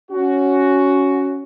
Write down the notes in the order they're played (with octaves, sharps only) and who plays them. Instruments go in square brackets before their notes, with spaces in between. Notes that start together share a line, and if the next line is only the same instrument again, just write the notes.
[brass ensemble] C#4 F#4